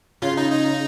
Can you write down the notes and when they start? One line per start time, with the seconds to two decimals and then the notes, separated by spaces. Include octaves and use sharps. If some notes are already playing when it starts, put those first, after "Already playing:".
0.22 C#3 F4
0.37 D#4
0.52 D#4